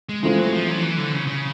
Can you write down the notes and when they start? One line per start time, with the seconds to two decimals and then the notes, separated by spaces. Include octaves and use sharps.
0.09 G#3
0.23 E3 G#3 A3 C4 F4
0.38 F#3
0.52 F3
0.68 F#3
0.83 E3
0.97 D3
1.12 C#3
1.27 C#3